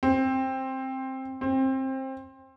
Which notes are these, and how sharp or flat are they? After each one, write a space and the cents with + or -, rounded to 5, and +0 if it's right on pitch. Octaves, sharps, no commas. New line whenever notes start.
C4 +10
C4 +20